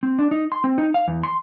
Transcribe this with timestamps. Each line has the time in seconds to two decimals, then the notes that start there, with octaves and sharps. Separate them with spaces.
0.03 C4
0.19 D4
0.31 D#4
0.52 C6
0.64 C4
0.78 D#4
0.94 F5
1.08 E2
1.23 C6